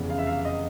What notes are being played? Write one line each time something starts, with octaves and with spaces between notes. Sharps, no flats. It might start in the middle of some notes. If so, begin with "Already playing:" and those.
Already playing: F1 E2 C#3
F5
E5
F5
D#5